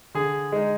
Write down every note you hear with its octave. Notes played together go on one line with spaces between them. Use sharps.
D3 G#4
G#3 D#4